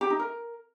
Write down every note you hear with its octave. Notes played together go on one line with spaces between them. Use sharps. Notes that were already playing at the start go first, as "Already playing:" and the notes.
G4
D#4
A#4